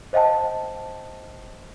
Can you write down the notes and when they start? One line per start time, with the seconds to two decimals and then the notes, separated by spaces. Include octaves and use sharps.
0.13 C5 D#5 F5 G5 A5